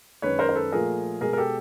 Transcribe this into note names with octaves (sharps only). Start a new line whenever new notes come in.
F#2 D#3 G#3 B4 C#5
A#4 C5
C5
A4 B4
A#2 F3 A3 G#4 A#4
B2 G#3 G#4 A#4
A#4
G4 A4